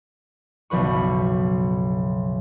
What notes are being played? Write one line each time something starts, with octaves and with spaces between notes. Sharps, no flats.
F#1 B1 F3 B4 C#6